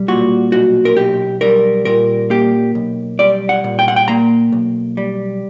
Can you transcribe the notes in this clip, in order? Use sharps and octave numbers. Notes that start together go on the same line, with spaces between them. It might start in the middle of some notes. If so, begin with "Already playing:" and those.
Already playing: B1 G3
A#2 F#4
B1 F#4
A#4
B1 G4
G3 A#4
A#2 A#4
A#3 G4
B1
G3 D5
F#5
A#2
G5
F#5
G5
A#3 A#5
B1
G3